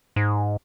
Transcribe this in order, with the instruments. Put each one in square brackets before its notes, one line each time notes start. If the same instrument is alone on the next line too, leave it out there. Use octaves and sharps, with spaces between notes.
[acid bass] G#2